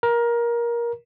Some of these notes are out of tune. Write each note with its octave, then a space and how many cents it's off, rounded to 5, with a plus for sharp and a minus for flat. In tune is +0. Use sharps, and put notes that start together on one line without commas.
A#4 +20